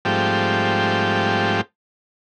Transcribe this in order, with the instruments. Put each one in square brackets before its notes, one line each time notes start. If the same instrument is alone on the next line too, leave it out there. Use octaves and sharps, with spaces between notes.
[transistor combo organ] G#2 F3 G3 A3 C4 G4